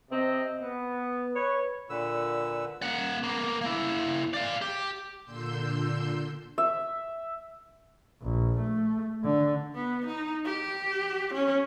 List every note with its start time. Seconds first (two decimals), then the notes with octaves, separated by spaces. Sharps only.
0.11 C3 C4 D#5
0.61 B3
1.35 B4 C#5
1.90 A#2 D3 B4 E6
2.82 A#3 F#5
3.24 A#3 B3
3.61 A#3 E4
4.34 D5 F5
4.62 G4
5.25 A#2 D3 C6 E6 G6
6.58 E5
8.21 A#1
8.59 A3
9.24 D3
9.75 B3
10.06 D#4
10.45 G4
11.34 C#4